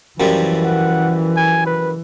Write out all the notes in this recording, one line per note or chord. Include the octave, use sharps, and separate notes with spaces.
F#2 E3 F3 G3
F#5
G#5
B4